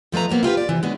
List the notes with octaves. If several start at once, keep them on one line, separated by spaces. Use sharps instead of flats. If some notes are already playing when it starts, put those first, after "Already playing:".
B2 F3 A3 B4 A#5
C3 F#3 A#3 B3
E4 F4 G4 B4
D5
C3 E3
E3 G#3 B3 C#4 D4